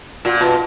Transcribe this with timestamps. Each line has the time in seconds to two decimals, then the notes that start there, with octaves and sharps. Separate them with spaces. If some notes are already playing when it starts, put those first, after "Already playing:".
0.25 A#2 F#4
0.37 F4
0.41 B2
0.49 F4